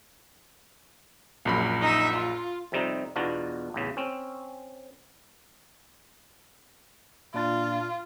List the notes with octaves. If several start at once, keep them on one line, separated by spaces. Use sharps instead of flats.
A#1 F#2 B5
D#4 E5
F4
F2 C3 G3 C4 D#4
E2 B2 D4 F4 F#4 A#5
A1 E2 C#3
C4 C#4
A#2 D4 F4 A6